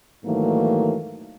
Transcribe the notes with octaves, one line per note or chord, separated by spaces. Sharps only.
G#2 D#3 E3 F#3 A3 A#3